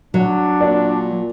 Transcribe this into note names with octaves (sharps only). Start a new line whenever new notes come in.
F#3 D4
A#2 D5